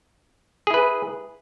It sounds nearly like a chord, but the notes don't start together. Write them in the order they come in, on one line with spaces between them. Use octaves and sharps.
G#4 E4 B4